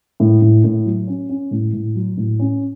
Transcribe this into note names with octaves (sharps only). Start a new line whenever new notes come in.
A2
A2
A2
F#3
C#4
C#4
A2
A2
F#3
A2
C#4